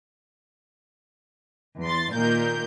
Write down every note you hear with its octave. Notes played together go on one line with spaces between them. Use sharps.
E2 C6 A6
A#2 D#3 A#3 A#4 G6